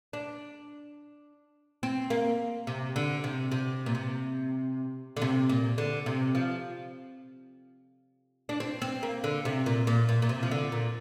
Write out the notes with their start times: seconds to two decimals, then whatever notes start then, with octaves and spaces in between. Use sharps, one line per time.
0.13 D4
1.83 C4
2.10 A#3
2.67 C3
2.96 D3
3.24 C3
3.52 C3
3.86 A#2
3.95 C3
5.17 D3
5.22 C3
5.49 A#2
5.78 D3
6.06 C3
6.35 F3
8.49 D4
8.60 C4
8.82 C4
9.03 A#3
9.24 D3
9.45 C3
9.66 A#2
9.87 A#2
10.09 A#2
10.22 A#2
10.29 C3
10.43 F3
10.51 D3
10.72 A#2